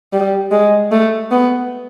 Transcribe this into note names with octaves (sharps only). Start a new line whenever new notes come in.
G3
G#3
A3
B3